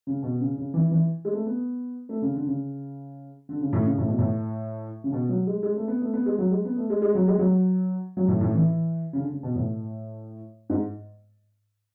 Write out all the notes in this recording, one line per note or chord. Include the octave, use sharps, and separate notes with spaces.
C#3
B2
C#3
C#3
E3
E3
G#3
A3
B3
A3
C#3
D3
C#3
D3
C#3
A2
C#3
A2
B2
A2
C#3
B2
F#3
G#3
G#3
A3
B3
A3
B3
G#3
F#3
G#3
B3
A3
G#3
G#3
F#3
G#3
F#3
F#3
A2
A2
E3
C#3
D3
C#3
B2
A2
G#2